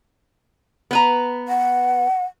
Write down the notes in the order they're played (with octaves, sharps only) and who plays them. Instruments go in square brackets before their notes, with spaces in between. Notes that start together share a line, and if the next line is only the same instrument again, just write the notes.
[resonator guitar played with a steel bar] B3 B4 A#5
[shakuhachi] F#5